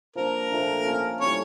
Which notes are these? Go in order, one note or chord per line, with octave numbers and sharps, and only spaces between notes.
F3 A#3 D4 A#4
A#2 F3 A3 D4
A#3 C#4 F4 A4
A2 G3 C#4 C#5